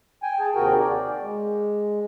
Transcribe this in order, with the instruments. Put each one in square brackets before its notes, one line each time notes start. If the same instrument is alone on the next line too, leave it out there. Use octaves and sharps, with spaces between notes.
[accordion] G5 G#5
G#4 A5
D#2 C3 F#4 G#4 A#4 G5
D5
G#3